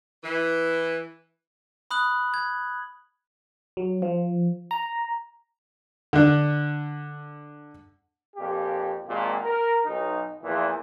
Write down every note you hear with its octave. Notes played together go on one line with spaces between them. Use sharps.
E3
B5 D#6 F#6 F#7
G#6
F#3
F3
A#5
D3 D4
F2 A#2 G4
G#1 A#2
A#4
B1 D#4
E2 A#2 E3 F3